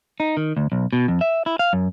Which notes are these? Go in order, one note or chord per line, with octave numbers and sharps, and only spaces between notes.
D#4
D#3
D2
B1
B2
F2
E5
E4
F5
F#2